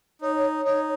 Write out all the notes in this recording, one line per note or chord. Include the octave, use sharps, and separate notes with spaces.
D#4 C#5
C#5
D#4 C#5